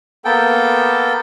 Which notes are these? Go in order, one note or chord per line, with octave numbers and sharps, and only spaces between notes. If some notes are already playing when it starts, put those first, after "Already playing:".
A#3 B3 A4 G5